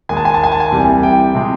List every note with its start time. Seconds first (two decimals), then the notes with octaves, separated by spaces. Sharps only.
0.09 D#2 D#3 G#3 G#5
0.17 A5
0.25 G#5
0.34 A5
0.44 G#5
0.52 A5
0.60 G#5
0.71 C2 C3 E3 G3
1.03 G5
1.35 C3 F3 G#3